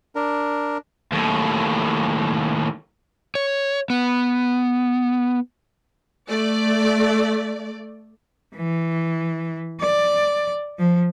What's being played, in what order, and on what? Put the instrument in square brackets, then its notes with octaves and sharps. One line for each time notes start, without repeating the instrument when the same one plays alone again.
[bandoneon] D4 A#4
[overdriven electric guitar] D#2 A2
[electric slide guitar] C#5
B3
[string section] A3 D5
[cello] E3
D5
F3